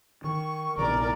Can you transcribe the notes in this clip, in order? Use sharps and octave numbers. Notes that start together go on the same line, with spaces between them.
D#3 C#6
A#1 C3 B3 A#4 D5